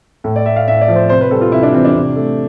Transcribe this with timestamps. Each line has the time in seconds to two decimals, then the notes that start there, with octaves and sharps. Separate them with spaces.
0.24 A2 A4
0.36 D5
0.46 A3 E5
0.56 F5
0.68 A2 E5
0.81 D5
0.88 F3
0.95 C5
1.10 C3 C5
1.21 B4
1.31 G3 A4
1.41 F4
1.52 C3 E4
1.63 D4
1.74 E3 C4
1.85 D4
1.95 C3
2.16 A3